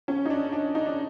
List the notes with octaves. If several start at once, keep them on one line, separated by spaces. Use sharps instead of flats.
C#4
D#4
D4
D4
D#4
D4